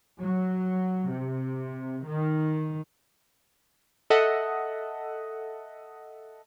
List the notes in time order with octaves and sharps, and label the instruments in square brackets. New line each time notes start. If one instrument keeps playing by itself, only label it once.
[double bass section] F#3
C3
D#3
[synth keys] A4 D#5 E5 F#5